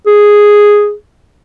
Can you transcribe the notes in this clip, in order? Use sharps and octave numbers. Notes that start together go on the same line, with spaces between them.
G#4